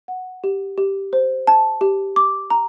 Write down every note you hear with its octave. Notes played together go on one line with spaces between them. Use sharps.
F#5
G4
G4
C5
A5
G4
D6
A#5